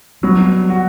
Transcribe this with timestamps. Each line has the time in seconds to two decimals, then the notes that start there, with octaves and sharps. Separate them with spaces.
0.23 F#3 G3 B3
0.70 F#4